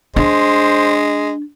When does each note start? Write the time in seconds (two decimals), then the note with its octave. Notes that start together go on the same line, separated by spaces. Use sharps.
0.16 G#3 D4 C5